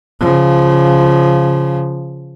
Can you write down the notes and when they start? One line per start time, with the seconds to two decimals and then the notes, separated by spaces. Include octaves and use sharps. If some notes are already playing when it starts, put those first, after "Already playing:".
0.20 C#3 F3